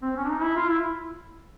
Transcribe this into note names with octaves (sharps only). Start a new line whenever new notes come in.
C4
C#4
D4
D#4
E4
F4
E4